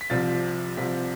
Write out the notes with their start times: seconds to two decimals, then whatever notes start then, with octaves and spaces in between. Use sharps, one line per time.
0.01 B6
0.10 C2 C3 F3 C4 F4 A6
0.77 C2 C3 F3 C4 F4 B6